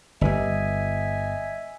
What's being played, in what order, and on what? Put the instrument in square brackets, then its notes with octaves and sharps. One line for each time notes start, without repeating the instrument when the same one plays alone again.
[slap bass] G1 G3 [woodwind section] D#5 E5 G#5